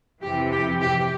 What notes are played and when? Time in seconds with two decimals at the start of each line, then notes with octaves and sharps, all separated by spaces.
0.22 F2 C3 E3 G4
0.51 G4
0.81 G4